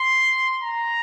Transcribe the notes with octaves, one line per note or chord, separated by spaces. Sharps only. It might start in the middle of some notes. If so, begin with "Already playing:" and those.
Already playing: C6
A#5